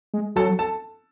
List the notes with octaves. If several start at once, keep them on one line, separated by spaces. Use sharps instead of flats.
G#3
F#3 A4 A5
A4 A5